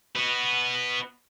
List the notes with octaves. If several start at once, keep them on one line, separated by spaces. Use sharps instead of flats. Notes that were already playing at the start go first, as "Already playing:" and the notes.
B3 F#4